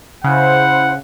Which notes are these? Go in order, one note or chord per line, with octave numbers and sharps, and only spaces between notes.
C#3 E4 C5 F#5